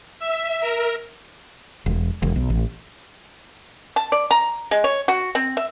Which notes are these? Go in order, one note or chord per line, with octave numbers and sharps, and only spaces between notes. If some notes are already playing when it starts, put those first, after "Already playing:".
E5
A#4
E1
E1
B1
A1
A5
D5
A#5
G#3
C#5
F#4
C4
E5